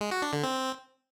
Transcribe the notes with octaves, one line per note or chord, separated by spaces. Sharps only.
G#3
F#4
D4
D3
C4